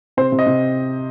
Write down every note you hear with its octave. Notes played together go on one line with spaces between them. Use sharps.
C3 C5
C3
D#5
C3